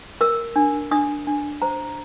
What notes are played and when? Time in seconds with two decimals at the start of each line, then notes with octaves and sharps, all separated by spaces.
0.21 A#4 E6
0.56 D4
0.91 D4 D#6
1.27 D4
1.62 C5 A#5